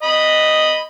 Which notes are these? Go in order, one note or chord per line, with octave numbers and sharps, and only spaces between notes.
D#5 B5